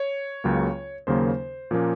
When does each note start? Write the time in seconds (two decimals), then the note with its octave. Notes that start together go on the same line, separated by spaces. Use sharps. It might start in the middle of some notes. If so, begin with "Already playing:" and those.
Already playing: C#5
0.44 C#2 C#3 F#3 A#3
1.07 D#2 C#3 F#3 A#3 C5
1.71 A#2 F3 A#3 C#4